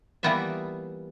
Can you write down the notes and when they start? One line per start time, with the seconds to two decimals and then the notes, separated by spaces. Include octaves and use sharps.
0.23 E3 G3 A#3 B3 F4 E5